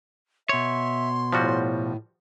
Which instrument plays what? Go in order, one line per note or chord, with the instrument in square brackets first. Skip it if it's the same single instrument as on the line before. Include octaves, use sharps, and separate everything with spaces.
[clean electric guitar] B2 C#5 [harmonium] E5 [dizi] C6
[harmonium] A2 [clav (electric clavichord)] F3 G3 F#4